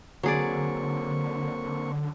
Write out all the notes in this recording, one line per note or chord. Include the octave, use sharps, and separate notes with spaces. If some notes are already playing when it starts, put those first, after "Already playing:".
D3 F#3 A#3 C4 G#4 D5 C#6